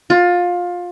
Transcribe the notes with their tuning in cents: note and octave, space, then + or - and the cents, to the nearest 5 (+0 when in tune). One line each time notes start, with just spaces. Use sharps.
F4 +20